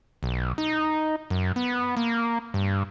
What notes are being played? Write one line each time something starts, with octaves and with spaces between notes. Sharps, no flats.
B1
D#4
F#2
B3
A#3
G2